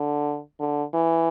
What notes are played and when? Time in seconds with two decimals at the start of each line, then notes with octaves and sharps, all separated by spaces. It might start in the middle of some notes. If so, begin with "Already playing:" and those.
Already playing: D3
0.60 D3
0.93 E3